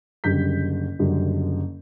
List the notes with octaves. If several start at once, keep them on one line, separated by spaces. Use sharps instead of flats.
F#1 F#2 D3 G3 G6 B6
F#1 F#2 D3 G3